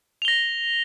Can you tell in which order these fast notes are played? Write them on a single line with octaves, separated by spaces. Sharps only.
F7 G7 A#6